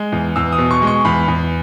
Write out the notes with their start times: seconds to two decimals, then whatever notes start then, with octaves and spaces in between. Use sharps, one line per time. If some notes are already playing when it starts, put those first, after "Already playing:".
Already playing: G#3
0.12 E2
0.36 E2 E6
0.52 D#6
0.58 B2
0.71 C#6
0.82 G#3
0.87 C#6
1.05 E2 B5
1.28 E2